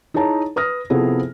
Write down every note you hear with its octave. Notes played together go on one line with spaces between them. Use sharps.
D#4 E4 G#4 C#5 A5 A#5
B4 D#6 F6 A#6
C3 F3 B3 E4 G#4 A4